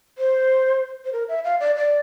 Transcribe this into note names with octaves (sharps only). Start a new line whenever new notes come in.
C5
C5
A#4
E5
F5
D5
D5